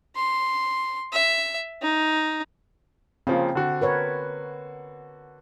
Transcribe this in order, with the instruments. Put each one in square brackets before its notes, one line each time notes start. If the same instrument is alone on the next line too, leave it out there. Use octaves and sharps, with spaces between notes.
[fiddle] C6
E5
D#4
[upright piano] C#3 F3 A#3 [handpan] C4
[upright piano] D3 F#4
[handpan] A#4 B4 C#5